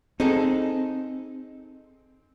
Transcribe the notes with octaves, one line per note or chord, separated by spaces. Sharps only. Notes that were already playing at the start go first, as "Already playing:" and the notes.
C4 D#4 G#4 A4